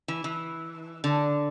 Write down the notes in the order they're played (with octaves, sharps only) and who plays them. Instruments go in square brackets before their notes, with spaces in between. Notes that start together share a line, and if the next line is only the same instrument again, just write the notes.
[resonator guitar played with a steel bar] E3
E3
D3